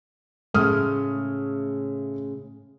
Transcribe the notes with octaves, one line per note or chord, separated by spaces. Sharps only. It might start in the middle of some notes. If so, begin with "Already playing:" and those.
A2 C#3 G#3 A3 D#6 F6